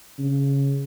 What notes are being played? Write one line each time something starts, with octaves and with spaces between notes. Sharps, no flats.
C#3